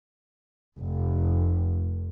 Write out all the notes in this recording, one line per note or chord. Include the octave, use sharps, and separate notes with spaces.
F1